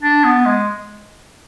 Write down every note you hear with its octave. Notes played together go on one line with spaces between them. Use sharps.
D4
B3
G#3